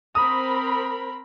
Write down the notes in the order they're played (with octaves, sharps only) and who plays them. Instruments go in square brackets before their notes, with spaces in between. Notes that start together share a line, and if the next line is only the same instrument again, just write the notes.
[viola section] C4 A#4 B5 [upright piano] D#6